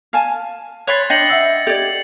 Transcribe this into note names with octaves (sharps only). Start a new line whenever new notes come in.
F5 G#5 A5 F6
C#5 B5 C6 F#6 G#6 A6
D4 D#5 G5 G6 C7 C#7 F#7
E5 F#5 E6
G4 A4 D5 G#6